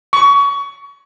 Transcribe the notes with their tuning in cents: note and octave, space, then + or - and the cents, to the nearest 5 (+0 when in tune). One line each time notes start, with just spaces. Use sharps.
C#6 +25